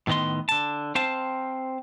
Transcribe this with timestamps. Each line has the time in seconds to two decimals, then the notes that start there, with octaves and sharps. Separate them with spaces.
0.07 A2 D#3 B3 D#5 C6
0.49 D3 A5
0.95 C4 C5 F5 A5